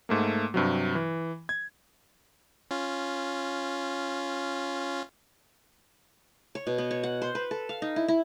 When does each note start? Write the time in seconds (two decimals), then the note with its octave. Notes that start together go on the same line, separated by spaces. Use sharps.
0.09 G#2 A3 A#3
0.54 G2 C3 F#3
0.95 E3
1.49 G#6
2.71 C#4 F4
6.55 C#5
6.67 B2
6.78 B3
6.91 C#5
7.03 F#5
7.22 C5
7.35 B4
7.51 A4
7.69 F5
7.82 D#4
7.96 E4
8.08 E4